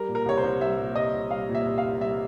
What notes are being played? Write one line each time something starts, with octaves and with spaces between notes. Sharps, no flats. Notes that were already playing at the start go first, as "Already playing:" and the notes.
Already playing: G3 A#4
A#2
A#4
C2 C#5
C5
C2
G3 E5
A#2
C2 D#5
C2
G3 F5
A#2
E5
C2
F5
C2
G3 E5